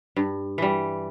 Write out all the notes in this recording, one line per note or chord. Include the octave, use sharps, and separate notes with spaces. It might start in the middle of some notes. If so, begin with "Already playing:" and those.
G2
E3 G3